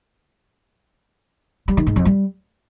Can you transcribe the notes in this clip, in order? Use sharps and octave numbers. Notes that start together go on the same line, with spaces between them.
G3
D#3
G#2
F2
G3